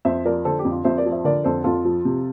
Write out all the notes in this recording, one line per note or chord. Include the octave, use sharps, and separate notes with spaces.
F2 C5 E5
F3 A#4 D5
D3 A4 C5
G4
F2
F4
F2 C5 E5
A#4 D5
F3
C5 E5
D3 A#4 D5
F2 A4 C5
F2 F4 A4
F3
C3